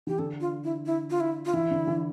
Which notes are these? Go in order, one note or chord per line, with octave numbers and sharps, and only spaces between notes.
E3 G4
D3 A4
F4
E4
E4
F4
E4
F4
E3 E4
D3
E3